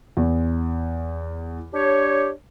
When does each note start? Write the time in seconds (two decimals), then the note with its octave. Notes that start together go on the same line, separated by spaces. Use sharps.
0.17 E2
1.73 D4 G4 C#5